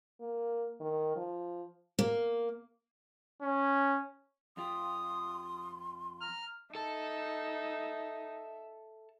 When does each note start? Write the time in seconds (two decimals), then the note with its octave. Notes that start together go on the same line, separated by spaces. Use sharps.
0.20 A#3
0.80 D#3
1.16 F3
1.99 A#3
3.42 C#4
4.57 F2 F4 G4 C6 D#6
6.21 A#5 F6
6.75 D#4 A4 E5 A5